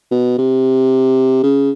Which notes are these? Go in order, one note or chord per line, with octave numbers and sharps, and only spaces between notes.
B2
C3
C#3